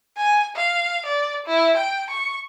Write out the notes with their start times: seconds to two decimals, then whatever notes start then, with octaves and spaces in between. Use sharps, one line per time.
0.17 G#5
0.56 F5
1.06 D5
1.46 E4
1.77 G5
2.10 C#6